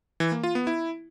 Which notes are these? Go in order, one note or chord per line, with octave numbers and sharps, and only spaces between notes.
E3
A#3
F4
B3
E4